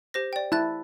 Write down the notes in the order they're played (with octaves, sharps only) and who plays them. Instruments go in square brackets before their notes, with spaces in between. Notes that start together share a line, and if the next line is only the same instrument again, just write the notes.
[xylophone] G4 C5 A#6
D5 G5
[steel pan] E4 [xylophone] A5 F#6 A6